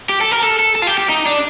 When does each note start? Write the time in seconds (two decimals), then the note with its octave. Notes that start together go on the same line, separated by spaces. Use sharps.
0.09 G4
0.21 A4
0.32 A#4
0.43 A4
0.59 A4
0.75 A4
0.82 F4
0.87 G4
0.98 G4
1.09 D#4
1.26 D4